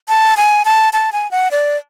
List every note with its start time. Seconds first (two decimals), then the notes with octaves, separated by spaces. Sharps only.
0.08 A5
0.37 G#5
0.65 A5
0.93 A5
1.12 G#5
1.31 F#5
1.51 D5